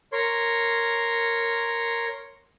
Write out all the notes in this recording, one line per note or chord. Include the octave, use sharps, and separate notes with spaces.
A#4 C#5 C6